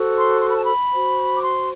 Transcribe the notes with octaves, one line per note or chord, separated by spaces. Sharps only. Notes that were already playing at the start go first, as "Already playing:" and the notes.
Already playing: F#4 A4 C5
C6
C6
B5
A5
B5
F#4 C5
D6
C6